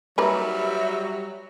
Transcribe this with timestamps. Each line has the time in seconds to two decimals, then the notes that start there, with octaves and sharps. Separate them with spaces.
0.18 F#3 G3 A#3 D#4 B4 E5